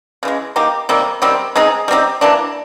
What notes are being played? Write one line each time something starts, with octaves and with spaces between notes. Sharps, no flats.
C#3 E3 G#3
A#3 D#4 G4
C3 D#3 G3 A#3
C3 D#3 G3 C4
G#3 C4 D#4 G#4
G3 C4 D#4 G4
E3 G3 A#3 D4